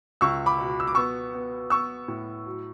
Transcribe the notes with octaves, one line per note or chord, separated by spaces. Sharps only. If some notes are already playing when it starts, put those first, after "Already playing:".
C#2 C#6 E6
B5 D6
B2
E6
D6
B3 C#6 E6
B3
B3 C#6 E6
A2
F#3